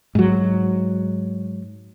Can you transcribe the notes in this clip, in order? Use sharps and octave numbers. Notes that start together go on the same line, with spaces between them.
G#2 F#3